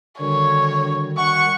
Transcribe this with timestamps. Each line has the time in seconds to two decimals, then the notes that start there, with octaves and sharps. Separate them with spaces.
0.21 D3 D#3 G3 F#4 C#5
1.17 F#5 C#6